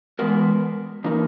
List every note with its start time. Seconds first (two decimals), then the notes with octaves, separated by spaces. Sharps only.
0.19 E3 G#3 B3 F#4 A#4
1.04 E3 A#3 D#4 A#4